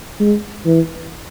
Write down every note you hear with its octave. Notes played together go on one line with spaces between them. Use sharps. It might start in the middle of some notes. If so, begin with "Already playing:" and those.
G#3
E3